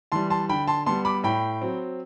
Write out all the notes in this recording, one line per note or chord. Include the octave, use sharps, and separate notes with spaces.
E3 G3 A5 C6
A5 C6
D3 G5 B5
A5 C6
G3 B3 A5 C6
B5 D6
A2 G5 B5
F#3 C4